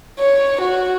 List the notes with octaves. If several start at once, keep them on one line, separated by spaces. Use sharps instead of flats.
C#5
F#4